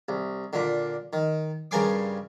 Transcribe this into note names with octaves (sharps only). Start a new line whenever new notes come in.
C2
A#2 D3
D#3
G2 C#3 A#4 G#5 C6 D6